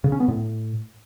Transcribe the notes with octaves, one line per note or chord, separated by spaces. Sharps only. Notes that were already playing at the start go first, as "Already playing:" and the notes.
C#3
C#4
B3
A2